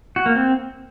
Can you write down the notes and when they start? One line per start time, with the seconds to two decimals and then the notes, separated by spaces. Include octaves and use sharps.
0.16 F#4
0.26 A#3
0.35 C4